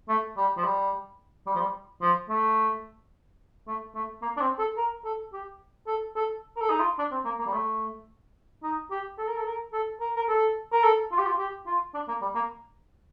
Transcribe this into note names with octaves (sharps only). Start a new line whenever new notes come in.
A3
G3
F3
G3
G3
F3
G3
F3
A3
A3
A3
A#3
D4
C4
A4
A#4
A4
G4
A4
A4
A#4
A4
D#4
F4
D4
C4
A#3
A#3
G3
A3
D#4
G4
A4
A#4
A4
A#4
A4
A#4
A#4
A4
A#4
A4
F4
G4
F4
G4
F4
D4
A#3
G3
A#3